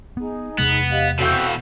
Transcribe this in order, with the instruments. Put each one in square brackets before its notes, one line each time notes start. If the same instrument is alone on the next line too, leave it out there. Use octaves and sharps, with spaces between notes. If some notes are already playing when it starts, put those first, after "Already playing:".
[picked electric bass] B3 [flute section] D#4 G#4
[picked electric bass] E2 C3 G#3 [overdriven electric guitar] B3
[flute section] G4 D#5 F5
[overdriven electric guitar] B2 E3 [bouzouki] A3 C4 G5 [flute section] F#4 A4 F5